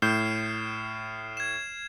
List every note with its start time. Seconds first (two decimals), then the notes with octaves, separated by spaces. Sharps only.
0.02 A2 F6 G6 C7 E7
1.37 G#6 E7